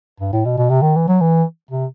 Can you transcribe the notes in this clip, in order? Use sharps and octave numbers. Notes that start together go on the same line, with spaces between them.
G2
A2
B2
B2
C3
D#3
E3
F#3
E3
C3